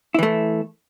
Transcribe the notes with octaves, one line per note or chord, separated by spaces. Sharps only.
E3 A3 E4